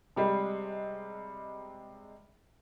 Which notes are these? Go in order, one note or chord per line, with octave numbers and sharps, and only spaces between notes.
C3 G3 G#3